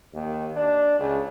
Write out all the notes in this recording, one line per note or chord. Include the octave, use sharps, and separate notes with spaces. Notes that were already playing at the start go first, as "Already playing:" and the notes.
D#2
D4
C#2